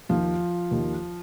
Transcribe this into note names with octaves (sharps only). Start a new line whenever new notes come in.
D#2 D#3 F3 F4
D#2 D#3